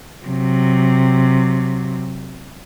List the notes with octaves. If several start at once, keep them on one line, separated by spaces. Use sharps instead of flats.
C3 F#3